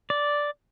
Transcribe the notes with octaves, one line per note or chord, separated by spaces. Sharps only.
D5